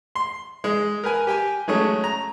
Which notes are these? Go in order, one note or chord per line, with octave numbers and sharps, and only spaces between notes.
C6
G#3
A#4 B4 G#5
G4 G5 G#5
F#3 G#3 A3 C#4
A#5